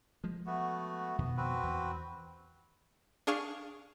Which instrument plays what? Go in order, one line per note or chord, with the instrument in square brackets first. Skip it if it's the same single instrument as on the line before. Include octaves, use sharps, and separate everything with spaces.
[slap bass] F3 G#3
[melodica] A3 B3 F#4
[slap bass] F2 B2 D#3 [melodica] B3
[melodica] C4 F#4 B4
[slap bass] E2
[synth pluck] D4 G#4 F5 C#6